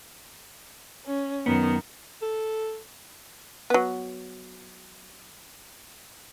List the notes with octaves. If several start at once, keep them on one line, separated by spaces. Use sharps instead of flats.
C#4
F#2 D#3 B3
A4
F#3 B3